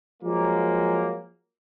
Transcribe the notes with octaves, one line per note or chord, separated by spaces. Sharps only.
F3 F#3 G#3 A#3